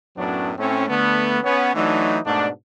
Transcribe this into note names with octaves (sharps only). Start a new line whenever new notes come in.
F#2 A2 F#3 B3 C#4 D4
A2 A3 C4 C#4
D3 A3 B3
B3 C#4
E3 F#3 A3 D4 D#4
G#2 B2 A3 D4